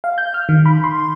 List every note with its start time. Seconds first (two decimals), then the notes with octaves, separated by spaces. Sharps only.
0.04 F5
0.18 G6
0.34 F6
0.49 D#3
0.66 B5
0.84 C6